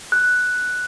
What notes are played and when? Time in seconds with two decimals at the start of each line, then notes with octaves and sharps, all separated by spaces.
0.12 F#6